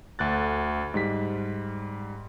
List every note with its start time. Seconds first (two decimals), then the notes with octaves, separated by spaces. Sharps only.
0.19 D2 D3 F#6 A6
0.94 G#2 G3 B6